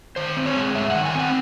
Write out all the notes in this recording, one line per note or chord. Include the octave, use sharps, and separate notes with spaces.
D#3 C5
C4
C#5
G#3
G#2 E5
D#3 F#5
G#5
C4 F#5